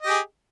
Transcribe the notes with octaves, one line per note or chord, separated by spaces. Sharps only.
G4 G#4 D#5